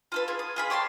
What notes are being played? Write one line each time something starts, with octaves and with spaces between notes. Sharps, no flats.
F4 A4 B4
F4 G#4
D#6
F4 G#4 B5
G4 C#5 A5 C6